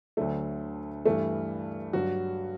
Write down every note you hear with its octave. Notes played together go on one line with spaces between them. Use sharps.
D2 D3 F#3 A3
G2 E3 G3 A3
G2 F#3 F#4